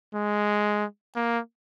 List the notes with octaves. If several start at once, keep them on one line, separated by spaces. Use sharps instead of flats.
G#3
A#3